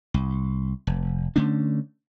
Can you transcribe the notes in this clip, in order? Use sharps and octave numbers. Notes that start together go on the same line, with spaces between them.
C2
F1
D3 A3 C#4 D4